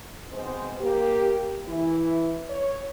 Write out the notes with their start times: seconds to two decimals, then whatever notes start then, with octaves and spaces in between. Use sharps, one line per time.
0.32 G#2 B2 G#3 C4 C5
0.81 A#3 G4
1.66 E3 E4
2.48 C#5